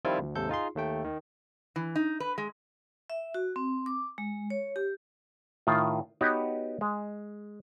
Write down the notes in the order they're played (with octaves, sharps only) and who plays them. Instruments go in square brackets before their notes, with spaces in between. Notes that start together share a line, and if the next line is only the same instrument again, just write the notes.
[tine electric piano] D#3 F3 G3 C4 E4 F4
D2
D#2 G#2 C3 A4 G6
D#4 F4 G#4 C6
D#2 A3 G5
D#3
[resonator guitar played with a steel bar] E3
D#4
B4
G#3
[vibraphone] E5
F#4
C4
D6
G#3
C#5
G4
[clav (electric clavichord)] A2 D#3 F4
B3 D#4 F#4 G4 B4 C#5
G#3